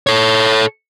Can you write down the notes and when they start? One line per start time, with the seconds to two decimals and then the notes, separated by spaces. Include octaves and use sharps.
0.07 A4 C#5